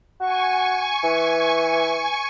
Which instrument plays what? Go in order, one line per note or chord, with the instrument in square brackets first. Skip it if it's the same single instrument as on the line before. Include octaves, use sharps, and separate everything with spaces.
[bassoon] F#4 [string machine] G#5 C#6
[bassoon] E3